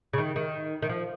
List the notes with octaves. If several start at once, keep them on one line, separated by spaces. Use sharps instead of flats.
C#3
D#3
D#3
D#3
F3